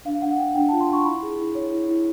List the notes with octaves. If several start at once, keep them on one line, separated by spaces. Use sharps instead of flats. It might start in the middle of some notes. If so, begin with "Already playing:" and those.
D4 F5
D4 F#5
D4 G5
D4 G5
F4 A5
C6
D4 C#6
E4 B5
G#4
E4
C#5
E4
E4